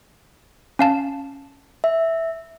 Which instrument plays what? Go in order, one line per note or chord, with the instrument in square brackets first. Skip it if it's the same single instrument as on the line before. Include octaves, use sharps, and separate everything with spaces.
[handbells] C#4 F5 A5
[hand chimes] E5